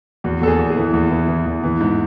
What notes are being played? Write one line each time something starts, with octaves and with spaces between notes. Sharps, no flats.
E2 F#4
E2 A4
G#4
E2
G#4
E3
E2
E3
E3
E2
E3
G#2